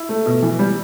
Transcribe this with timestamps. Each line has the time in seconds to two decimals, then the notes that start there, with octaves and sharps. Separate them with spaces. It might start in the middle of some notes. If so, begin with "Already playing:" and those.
Already playing: E4
0.09 A3
0.26 B2
0.42 E3
0.59 G3